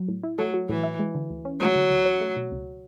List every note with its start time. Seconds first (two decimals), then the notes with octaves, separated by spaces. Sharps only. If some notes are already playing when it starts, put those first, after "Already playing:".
Already playing: F#3
0.08 A2
0.23 E4
0.38 F#3 A3
0.54 F#3
0.69 A2 E3
0.83 E4
0.99 G#3
1.15 D3
1.30 D2
1.45 C#4
1.60 F#3 G#3
1.76 D3
1.90 D2
2.05 C#4
2.21 A3
2.36 B2
2.52 C#2